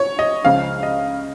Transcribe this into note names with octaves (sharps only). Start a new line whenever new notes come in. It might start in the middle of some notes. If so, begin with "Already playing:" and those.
Already playing: C#5
D#5
C#2 C#3 F3 F5
D#5